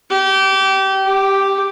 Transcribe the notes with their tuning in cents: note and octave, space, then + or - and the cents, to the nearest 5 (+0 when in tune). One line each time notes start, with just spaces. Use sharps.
G4 -25
G4 +0